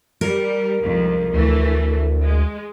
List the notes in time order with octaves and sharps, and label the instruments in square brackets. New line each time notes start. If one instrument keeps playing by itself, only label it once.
[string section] G3 [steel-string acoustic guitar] A#4
[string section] C2 F2 G#2
[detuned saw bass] D2 [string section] E3 A3
[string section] G#3